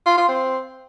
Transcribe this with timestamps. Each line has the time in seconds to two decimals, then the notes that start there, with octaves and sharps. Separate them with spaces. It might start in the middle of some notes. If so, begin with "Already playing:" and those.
0.06 F4
0.17 F4
0.29 C4